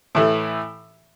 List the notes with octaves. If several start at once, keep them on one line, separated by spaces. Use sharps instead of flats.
A2 E3 A3